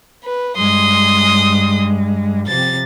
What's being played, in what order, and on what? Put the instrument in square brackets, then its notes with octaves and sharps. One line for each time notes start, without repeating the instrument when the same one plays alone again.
[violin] B4
[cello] G2 G#3 [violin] C6 D#6
[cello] C3 F3 [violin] A6